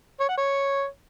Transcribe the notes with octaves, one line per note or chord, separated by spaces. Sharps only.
C#5
F#5
C#5